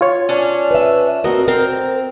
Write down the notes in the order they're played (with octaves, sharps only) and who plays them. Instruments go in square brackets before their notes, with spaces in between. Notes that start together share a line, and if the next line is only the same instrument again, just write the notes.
[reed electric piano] F4 C#5
[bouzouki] C#4 D4
[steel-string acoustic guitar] B4 E5
[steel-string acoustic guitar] C4 F#4 A#4 [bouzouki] D#5
[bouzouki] C4 [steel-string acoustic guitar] A#4